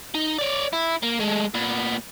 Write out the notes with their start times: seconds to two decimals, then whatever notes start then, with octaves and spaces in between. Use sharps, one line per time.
0.14 D#4
0.38 C#5 D5
0.73 E4
1.03 A#3
1.20 G#3 A3
1.54 A#2 B3